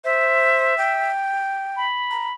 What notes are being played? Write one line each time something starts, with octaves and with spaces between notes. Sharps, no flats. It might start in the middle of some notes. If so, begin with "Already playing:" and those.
C5 E5
G5
B5
A#5